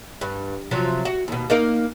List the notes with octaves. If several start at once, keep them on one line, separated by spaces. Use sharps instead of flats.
G2
C3 F3 F#3
F#4
D#2 B2
A#3 D#4 A#4